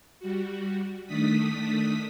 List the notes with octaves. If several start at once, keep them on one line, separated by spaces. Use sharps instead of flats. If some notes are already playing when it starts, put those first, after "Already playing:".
G3 F#4
D#3 A3 D4 D#6 B6